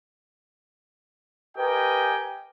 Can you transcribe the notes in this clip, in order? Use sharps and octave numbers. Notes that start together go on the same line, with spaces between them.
G4 A#4 B4 D#5 G5 G#5